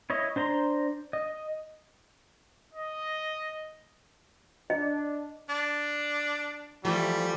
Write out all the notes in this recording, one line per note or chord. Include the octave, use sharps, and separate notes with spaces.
E4 C#5 D#5
D4 C5 A#5 C6
D#5
D#5
D4 D#5
D4
E3 F3 G3 A3